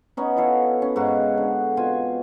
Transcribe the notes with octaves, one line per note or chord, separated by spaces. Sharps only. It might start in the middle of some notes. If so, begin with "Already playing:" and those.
B3 C#4 D#4
E4 F#4 A4 F5
C#4
G#2 D#4 F#4 F5
D3
B2 C4 F4 G#5